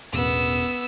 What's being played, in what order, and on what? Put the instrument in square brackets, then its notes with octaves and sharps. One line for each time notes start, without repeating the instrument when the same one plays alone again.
[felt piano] E1 A1 [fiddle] B3 E6